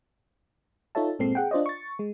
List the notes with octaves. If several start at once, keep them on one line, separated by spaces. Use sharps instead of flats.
D#4 F4 A4 C#5 E5 A5
G1 A#2 G#3 C4 A4 C7
G#4 F#5 G5
D4 F4 C5 D5 D#5
C#6 A6
G#3